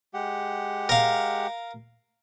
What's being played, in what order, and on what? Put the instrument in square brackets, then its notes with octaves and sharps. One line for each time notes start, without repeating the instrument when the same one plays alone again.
[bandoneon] G#3 G4 F#5
[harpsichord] A#4 F5